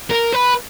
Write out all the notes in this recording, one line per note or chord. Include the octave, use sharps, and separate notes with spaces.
A#4
B4